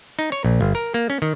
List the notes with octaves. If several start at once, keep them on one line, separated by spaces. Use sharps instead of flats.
D#4
C#5
A#1
G1
A#4
A#3
C#4
D#3